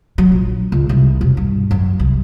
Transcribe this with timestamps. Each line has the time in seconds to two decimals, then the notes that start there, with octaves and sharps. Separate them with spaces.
0.18 F#3
0.32 A#1
0.72 C#2
0.89 C2
1.21 E1
1.37 G2
1.71 F#2
2.00 C2